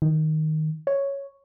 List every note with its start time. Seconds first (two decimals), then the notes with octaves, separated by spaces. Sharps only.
0.02 D#3
0.87 C#5